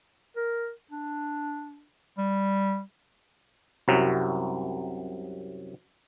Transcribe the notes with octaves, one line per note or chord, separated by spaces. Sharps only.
A#4
D4
G3
C2 F#2 C3 F#3